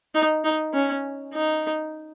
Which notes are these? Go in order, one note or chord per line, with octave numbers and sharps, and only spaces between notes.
D#4
D#4
C#4
D#4